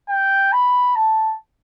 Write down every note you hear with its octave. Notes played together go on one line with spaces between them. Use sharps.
G5
B5
A5